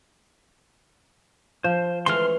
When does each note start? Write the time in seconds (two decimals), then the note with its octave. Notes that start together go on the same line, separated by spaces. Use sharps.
1.64 F3 C5
2.06 E3 G#3 A3 C6 F6